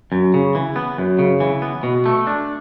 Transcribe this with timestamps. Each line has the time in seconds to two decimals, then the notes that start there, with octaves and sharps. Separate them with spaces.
0.12 F#2
0.34 C#3
0.55 E3
0.76 B3
0.98 F#2
1.19 C#3
1.40 E3
1.62 B3
1.83 B2
2.06 A3
2.27 D4